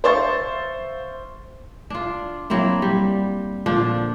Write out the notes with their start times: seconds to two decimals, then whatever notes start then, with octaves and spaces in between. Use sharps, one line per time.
0.04 C5 E5 F5 C6 C#6 A6
1.90 D4 F4
2.50 F#3 A#3 C4 E4
2.82 G3
3.66 A#2 D3 F3 D4